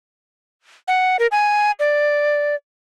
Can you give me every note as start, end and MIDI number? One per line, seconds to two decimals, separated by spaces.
0.88 1.17 78
1.19 1.27 70
1.32 1.71 80
1.79 2.55 74